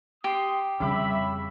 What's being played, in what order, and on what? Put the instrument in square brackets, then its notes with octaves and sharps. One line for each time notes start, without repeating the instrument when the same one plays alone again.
[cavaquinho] G4 [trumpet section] C6 D#6
[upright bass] F2 G3 [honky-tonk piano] C#3 D6 [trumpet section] E5 B5